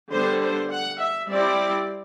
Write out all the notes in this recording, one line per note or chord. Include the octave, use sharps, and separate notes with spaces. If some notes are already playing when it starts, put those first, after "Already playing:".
D3 G3 B3 D4 C5
C5
F#5
E5
G3 C4 E4 D5